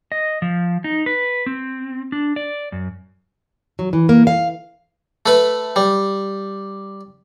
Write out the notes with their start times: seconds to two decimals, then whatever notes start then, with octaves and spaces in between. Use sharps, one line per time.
0.12 D#5
0.42 F3
0.84 D#4
1.06 B4
1.46 C4
2.12 D4
2.36 D5
2.72 F#2
3.79 F#3
3.93 E3
4.09 A#3
4.27 F5
5.26 A3 B4
5.76 G3